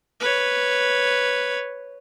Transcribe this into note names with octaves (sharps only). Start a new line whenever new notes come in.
B4 C#5